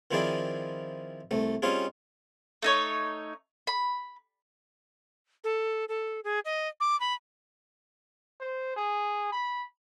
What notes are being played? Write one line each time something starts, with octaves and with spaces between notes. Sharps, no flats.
D#3 F3 C4 E4 G#4 D5
C2 A3
G3 C4 C#4 D#4 F4 G#4
A3 D#4 C#5
B5
A4
A4
G#4
D#5
D6
B5
C5
G#4
B5